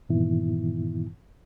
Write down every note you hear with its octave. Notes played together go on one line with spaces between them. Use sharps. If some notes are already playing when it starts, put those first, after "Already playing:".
G2 A#2 D#3 E3 B3 E4